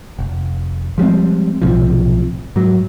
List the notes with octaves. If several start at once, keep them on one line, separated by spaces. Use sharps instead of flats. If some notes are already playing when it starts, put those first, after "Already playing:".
F1
F3 G3 G#3 C4
B1 A2 C3 F3
G#2 F#3